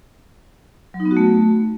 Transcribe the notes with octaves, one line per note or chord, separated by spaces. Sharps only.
F#3
D#4
B3
F#4
A3